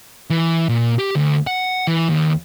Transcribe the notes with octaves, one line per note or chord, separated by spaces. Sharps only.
E3
A#2
G4
D2
F#5
E3
D#2